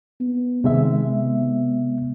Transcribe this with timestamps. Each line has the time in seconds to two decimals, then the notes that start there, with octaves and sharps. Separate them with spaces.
0.20 B3
0.64 C3 D#3 G#3 E5
1.08 B3